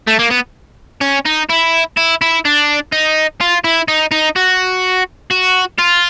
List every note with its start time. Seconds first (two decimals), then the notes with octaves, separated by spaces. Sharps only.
0.07 A3
0.19 A#3
0.30 B3
1.01 C#4
1.26 D#4
1.50 E4
1.97 E4
2.22 E4
2.45 D4
2.92 D#4
3.41 F4
3.64 E4
3.88 D#4
4.11 D#4
4.36 F#4
5.31 F#4
5.79 F4